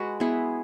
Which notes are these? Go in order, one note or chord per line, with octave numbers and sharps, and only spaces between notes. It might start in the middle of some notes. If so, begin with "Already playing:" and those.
Already playing: G#3 F#4 B4
B3 E4 G#4